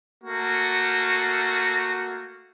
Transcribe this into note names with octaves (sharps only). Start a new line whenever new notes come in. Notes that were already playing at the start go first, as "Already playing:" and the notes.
A3 A#3 F#4